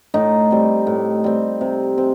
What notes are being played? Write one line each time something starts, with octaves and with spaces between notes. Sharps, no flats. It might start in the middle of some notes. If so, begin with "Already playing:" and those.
A2 D#4
G3 C4
A2
G3 C4
C3
C4